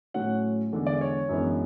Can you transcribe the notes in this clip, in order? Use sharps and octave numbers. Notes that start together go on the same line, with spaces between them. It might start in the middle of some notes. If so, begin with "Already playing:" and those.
A2 F#3 C#4 F#5
E2 D3 G#3 D4
D5
C#5
F#2 E3 G#3 B3 D4